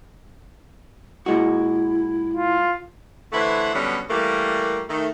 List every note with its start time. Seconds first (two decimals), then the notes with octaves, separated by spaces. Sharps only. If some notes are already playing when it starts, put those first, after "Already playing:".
1.26 A#2 G#3 E4 F#4
2.33 F4
3.33 D3 E3 A3 E4 B4 C5
3.75 B2 D3 F#3 G3 B3 C#4
4.10 E3 G3 A3 A#3
4.89 D#3 A3